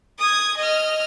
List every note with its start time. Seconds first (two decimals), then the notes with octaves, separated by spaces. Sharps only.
0.19 D#6 G#6
0.57 D#5 F6